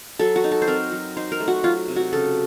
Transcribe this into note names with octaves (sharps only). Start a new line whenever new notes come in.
F#3 A4
F#4
D#4
A4
C5
C4 A#4
F#3
D#4 C5
A#4
A3
F#4
F#3 F4
C3
F#4
C#3 A4